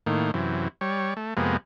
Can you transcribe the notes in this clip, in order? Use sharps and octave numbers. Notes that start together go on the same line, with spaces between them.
A2 D#3 A#3
F#2 C3 E3
G3 C#5
A3
F2 C3 G#3 A#3 B3